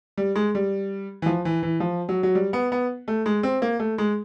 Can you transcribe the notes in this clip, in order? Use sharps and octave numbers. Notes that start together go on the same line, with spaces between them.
G3
G#3
G3
E3
F3
E3
E3
F3
F#3
F#3
G3
B3
B3
A3
G#3
C4
A#3
A3
G#3